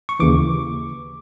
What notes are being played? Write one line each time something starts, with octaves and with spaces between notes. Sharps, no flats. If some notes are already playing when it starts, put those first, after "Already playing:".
C#6
D#2 C#3 E3 D6